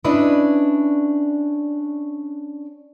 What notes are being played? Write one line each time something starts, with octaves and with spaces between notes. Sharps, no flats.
C#4 D4 E4 B4 D5 D#5